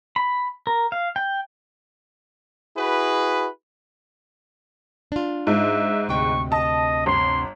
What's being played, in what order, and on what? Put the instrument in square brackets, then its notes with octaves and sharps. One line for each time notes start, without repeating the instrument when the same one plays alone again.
[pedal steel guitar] B5
A#4
F5
G5
[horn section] E4 F#4 G#4 B4
[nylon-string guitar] D4 F4
[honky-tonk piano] G#2 [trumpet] E5
[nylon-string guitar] D2 C3 G5 [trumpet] C#6
[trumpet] D#5 [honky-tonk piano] A5
[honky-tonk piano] G1 [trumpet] C6